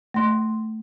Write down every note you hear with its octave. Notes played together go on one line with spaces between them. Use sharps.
A3 C6